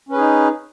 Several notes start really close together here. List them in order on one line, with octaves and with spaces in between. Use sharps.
C#4 B4 G#4 D#4